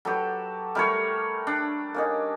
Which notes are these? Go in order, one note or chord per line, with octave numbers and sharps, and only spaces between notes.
F#3 G4 A4 B4
G3 A3 A4 A#4 C#5
D4
A#3 C#4 D#4